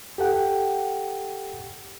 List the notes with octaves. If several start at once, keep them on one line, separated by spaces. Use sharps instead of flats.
G4 A4 F#5 G5